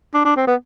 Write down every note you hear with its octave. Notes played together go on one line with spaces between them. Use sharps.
D4
D4
C4
B3